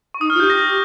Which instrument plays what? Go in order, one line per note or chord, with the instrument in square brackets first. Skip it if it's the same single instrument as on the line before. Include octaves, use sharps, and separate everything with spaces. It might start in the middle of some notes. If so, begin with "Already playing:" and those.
[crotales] C#6
[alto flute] D#4 [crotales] D#6
[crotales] F6
[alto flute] F4
[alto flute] G4 [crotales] G6
[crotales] A#6